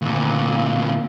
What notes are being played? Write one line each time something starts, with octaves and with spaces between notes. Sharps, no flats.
D2 A#2